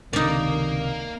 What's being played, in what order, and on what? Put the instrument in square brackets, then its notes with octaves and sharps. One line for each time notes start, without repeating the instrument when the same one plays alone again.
[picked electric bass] C#2 C3 [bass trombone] D#3 [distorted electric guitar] A#3 [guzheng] D#4 D5